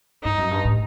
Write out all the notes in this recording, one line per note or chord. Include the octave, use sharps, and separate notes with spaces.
G2 D#4
F#2
G2
A2